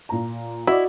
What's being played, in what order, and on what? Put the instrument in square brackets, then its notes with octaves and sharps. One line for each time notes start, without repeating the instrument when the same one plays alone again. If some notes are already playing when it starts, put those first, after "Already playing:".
[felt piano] A#2 A#5
[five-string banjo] E4 [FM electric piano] F#4 D5 [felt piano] D#5